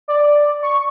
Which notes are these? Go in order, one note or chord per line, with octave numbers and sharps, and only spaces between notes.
D5
C#6